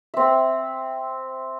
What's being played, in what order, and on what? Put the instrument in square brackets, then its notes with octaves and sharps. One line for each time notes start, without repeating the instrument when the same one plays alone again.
[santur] C4 E5